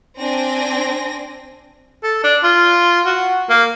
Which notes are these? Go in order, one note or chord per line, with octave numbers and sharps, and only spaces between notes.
C4 D4 G#5 A#6
A4
D4
F4
F#4
A#3